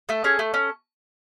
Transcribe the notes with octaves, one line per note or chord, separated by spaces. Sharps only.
A3 A4
C#4 G#4
A3
C#4